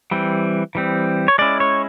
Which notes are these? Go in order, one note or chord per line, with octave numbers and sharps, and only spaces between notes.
E3 G3 C4
E3 G3 C4
C#5
G#3 C#4 E4 D5
C#5